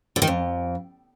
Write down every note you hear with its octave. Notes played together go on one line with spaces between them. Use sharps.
D3
D#3
F2